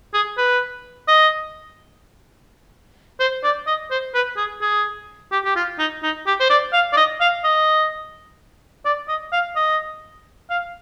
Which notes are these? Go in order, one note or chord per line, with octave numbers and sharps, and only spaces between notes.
G#4
B4
D#5
C5
D5
D#5
C5
B4
G#4
G#4
G4
G4
F4
D#4
D#4
G4
C5
D5
F5
D5
D#5
F5
D#5
D5
D#5
F5
D#5
F5